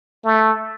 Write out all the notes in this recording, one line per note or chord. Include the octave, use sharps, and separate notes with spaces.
A3